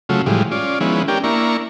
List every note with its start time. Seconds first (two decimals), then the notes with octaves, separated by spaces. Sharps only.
0.09 C#3 F#3 A3 F4
0.26 A2 E3 F3 G3 G#3
0.51 C#4 F4 D5
0.81 D#3 F3 G#3 B3 C#4 E4
1.08 C#4 D4 G4 A#4 G5
1.24 A#3 D4 E4 A#5 C#6